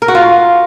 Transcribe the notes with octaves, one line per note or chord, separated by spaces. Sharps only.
A#4
F#4
F4